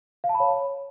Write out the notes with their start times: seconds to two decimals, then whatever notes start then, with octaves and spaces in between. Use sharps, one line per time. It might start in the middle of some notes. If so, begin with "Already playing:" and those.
0.24 F5
0.29 A5
0.35 B5
0.40 C#5